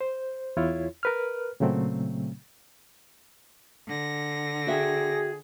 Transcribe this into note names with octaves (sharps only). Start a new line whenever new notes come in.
C5
E2 E4 F4 C#5
A#4 B4 F6
A#2 C#3 F#3 A3 C4
D3 A#6
F#4 G#4 E5 G5